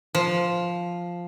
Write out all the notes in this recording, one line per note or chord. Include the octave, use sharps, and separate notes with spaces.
F3